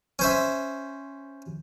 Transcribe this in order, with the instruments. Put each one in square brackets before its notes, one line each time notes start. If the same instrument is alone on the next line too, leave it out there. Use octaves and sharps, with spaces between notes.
[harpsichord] C#4 C5 E5